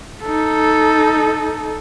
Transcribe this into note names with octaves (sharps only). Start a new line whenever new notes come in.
D#4 A4